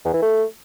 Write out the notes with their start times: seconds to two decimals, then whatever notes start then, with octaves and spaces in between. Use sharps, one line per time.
0.05 E2
0.13 E3
0.22 A3